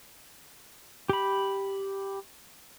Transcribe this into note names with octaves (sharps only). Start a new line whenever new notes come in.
G4 B5